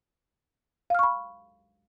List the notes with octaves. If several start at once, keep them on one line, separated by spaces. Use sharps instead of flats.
F5 B5 C#6 F6